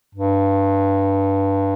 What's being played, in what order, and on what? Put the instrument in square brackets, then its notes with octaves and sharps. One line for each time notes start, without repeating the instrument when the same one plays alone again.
[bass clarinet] G2